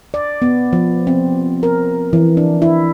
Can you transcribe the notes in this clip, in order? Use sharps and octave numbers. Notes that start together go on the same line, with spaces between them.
D5
B3
F3
C4
A#4
E3
D4
E4